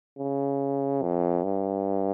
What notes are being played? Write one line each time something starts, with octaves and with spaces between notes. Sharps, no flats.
C#3
F2
G2